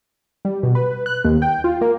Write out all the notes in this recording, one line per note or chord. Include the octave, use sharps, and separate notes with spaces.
G3
B2
B4
F#6
D#2
G5
F4
A#3